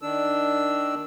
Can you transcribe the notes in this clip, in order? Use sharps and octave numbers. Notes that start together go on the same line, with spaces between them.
D#3 D4 E6